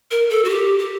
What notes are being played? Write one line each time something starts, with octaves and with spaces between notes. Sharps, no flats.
A#4
A4
F#4
G4
G4